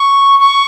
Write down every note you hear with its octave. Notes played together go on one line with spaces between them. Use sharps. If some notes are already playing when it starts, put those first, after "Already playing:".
Already playing: C#6
C#6